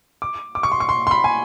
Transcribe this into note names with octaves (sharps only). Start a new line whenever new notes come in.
D6
D6
C#6
C6
C#6
C6
C6
B5
G#5